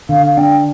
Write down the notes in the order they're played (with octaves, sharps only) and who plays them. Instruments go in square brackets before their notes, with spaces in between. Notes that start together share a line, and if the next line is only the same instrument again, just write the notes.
[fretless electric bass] D3 [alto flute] F5
[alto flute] F5
[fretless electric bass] D4 [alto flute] G5